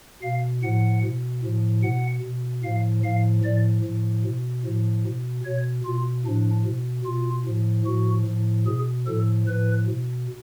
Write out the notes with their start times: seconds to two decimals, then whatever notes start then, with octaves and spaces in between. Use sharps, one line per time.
0.22 B2 F5
0.63 A2 F3 F#5
1.03 B2
1.43 A2 F3
1.83 B2 F#5
2.23 B2
2.64 A2 F3 F5
3.04 A2 F3 F5
3.44 A2 F3 D5
3.84 A2 F3
4.25 B2
4.64 A2 F3
5.05 B2
5.44 B2 C#5
5.85 B2 F4
6.25 A2 F3 D4
6.65 B2
7.05 B2 F4
7.45 A2 F3
7.86 A2 F3 F#4
8.26 A2 F3
8.66 B2 G#4
9.06 A2 F3 A4
9.47 A2 F3 B4
9.87 B2